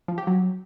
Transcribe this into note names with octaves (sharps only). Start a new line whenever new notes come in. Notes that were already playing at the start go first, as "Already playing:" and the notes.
F3
G4
F#3